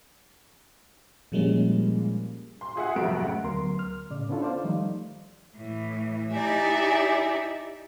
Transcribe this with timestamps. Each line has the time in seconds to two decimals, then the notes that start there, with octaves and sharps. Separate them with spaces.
1.32 A#2 F3 G3 G#3 A#3 C#4
2.61 C6
2.76 F4 G#4 E5 F#5
2.96 F1 F2 F#3 A3 E5 D7
3.15 C#2 F#5
3.44 D2 F#3 B3 A#4 C6
3.79 F6
4.10 A2 C#3 D5
4.29 B3 C#4 D4 E4 F4 A4
4.42 C5 D5 F5
4.64 D#3 F3 G3 A3 D#4
5.56 A2 E3
6.32 D#4 E4 G4 D5 E5 G#5